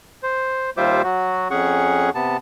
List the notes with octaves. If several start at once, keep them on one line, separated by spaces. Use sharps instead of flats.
C5
D#2 G3 F4 C5 E5 D6
F#3 F#4
F2 C#4 G#4 F#5 C#6
C3 B3 A5